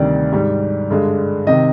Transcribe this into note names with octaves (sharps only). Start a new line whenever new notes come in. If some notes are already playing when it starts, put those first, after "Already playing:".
Already playing: D2 C3 D#3 G3 D5
G#2 G3
G2 D3 G#3
C3 D#3 D#5